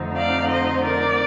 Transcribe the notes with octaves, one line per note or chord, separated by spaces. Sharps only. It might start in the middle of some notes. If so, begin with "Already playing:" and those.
Already playing: F2 D3 A3 C4 D#4
D5 F5
C5 D#5
A#4 D5